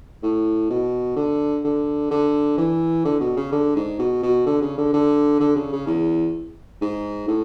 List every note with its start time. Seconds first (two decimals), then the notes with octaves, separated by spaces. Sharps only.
0.23 A2
0.70 B2
1.17 D3
1.65 D3
2.11 D3
2.58 E3
3.05 D3
3.20 B2
3.37 C#3
3.52 D3
3.76 G#2
3.99 B2
4.23 B2
4.46 D3
4.62 C#3
4.78 D3
4.93 D3
5.40 D3
5.56 C#3
5.72 C#3
5.87 E2
6.81 G#2
7.28 A2